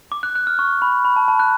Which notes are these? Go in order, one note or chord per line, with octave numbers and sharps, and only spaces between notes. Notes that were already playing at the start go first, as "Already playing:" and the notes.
D6
F#6
F#6
F6
C#6
B5
B5
A5
A5
F#6